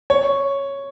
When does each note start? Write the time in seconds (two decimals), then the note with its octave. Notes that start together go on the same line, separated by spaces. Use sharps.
0.10 C#5